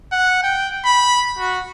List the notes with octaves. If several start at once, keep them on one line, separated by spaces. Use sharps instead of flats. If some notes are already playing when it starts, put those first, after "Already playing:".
F#5
G5
B5
F#4